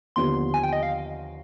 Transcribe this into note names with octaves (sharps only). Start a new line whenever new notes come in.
D#2 D3 F3 B3 C6
G#5
G5
D#5
F5